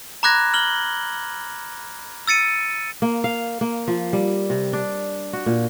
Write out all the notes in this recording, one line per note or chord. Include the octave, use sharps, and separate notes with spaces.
A#5 B5 D6 F#6 G#6 A#6
F6 F#7 G7
E6 A6 C#7 D#7
A#3
F5
A#3
F3
G3
C3
D4
F#4
A#2